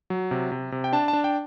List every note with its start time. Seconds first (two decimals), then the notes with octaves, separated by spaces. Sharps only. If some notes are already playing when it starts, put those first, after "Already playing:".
0.10 F#3
0.31 C3
0.52 C3
0.72 C3
0.84 G5
0.93 D4 A5
1.08 A5
1.13 D4
1.24 G5